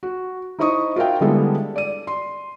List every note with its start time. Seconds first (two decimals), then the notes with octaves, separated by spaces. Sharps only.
0.03 F#4
0.59 D#4 E4 C5 D#5 C#6 D#6
0.96 F4 F#4 A#4 E5 F5 G5
1.21 D3 G3 G#3 B3 E4 A4
1.76 D5 D#7
2.07 C6